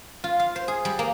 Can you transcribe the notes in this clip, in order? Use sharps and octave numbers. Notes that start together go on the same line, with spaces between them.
F4
F5
C5
G#4
G3
A#3